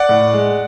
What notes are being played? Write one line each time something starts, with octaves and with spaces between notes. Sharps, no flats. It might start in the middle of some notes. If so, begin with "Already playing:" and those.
Already playing: D5 F#5
A2
G#3